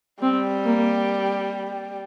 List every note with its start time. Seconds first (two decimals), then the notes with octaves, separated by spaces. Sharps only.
0.22 G3 C4
0.66 A#3